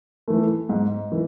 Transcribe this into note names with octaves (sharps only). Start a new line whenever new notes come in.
E3 A3
G#2
E3